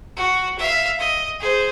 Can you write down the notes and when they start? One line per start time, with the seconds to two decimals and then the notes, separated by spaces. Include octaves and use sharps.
0.16 F#4
0.58 E5 F5
0.99 D#5
1.40 G#4 C5